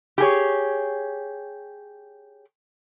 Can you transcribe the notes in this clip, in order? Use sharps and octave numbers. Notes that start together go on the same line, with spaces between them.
G4 G#4 C#5